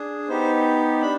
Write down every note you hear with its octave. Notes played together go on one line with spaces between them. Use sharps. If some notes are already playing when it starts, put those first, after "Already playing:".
Already playing: D4 G#4
B3 D#4 G4 C5
D4 B5